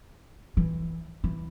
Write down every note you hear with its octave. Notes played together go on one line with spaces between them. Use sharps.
E3
E3